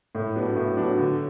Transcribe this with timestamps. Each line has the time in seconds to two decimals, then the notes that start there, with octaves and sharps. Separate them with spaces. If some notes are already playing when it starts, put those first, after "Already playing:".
0.15 A2
0.36 F#3 B3 D4
0.56 A2
0.77 F#3 B3 D4
0.98 D3